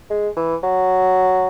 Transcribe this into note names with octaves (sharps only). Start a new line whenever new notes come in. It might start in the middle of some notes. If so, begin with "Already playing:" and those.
G#3
E3
F#3